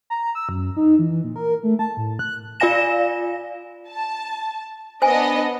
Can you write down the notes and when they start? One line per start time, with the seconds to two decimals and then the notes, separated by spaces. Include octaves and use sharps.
0.10 A#5
0.35 E6
0.49 F#2
0.77 D#4
0.99 E3
1.24 A#2
1.36 A#4
1.63 A3
1.79 A5
1.97 A2
2.19 F#6
2.60 F4 D5 F5 G#5 A#6 E7
3.89 A5
5.02 B3 D4 C5 D#5 G#5